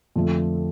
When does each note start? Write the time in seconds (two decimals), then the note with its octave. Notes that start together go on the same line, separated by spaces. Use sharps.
0.16 F2 D3 F3 A3